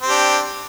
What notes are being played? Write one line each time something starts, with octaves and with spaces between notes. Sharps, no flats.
C4 D4 G4